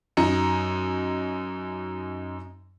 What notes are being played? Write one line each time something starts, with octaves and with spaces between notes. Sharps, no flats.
F#2 D#4 A#5 C#7